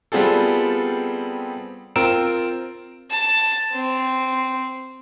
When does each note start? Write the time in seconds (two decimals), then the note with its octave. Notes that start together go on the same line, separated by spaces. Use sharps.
0.12 G3 B3 C4 F4 G#4 A4
1.96 C4 F4 A#4 E6 D7 E7
3.11 A5
3.72 C4